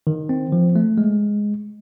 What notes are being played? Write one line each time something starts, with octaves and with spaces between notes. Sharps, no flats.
D#3
C4
F3
A3
G#3